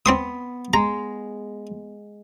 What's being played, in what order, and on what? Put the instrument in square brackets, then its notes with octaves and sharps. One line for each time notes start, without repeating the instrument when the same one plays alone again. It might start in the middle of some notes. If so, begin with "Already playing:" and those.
[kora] B3 [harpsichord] C4 C6 D#6
[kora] G#3 [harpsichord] A#5